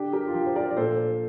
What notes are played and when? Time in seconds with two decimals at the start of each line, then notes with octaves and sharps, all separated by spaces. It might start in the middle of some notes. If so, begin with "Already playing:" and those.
Already playing: D3 D4 G4
0.13 G4 A#4
0.28 F4
0.34 F3 G4
0.46 C5
0.56 A#4 D5
0.71 D5
0.77 A#2 A4 C5